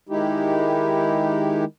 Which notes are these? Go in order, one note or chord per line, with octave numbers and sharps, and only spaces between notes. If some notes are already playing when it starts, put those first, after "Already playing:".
D#3 G#3 D#4 E4 G4